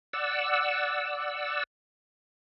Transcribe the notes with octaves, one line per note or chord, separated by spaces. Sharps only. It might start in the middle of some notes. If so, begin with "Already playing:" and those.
D5 F#5 E6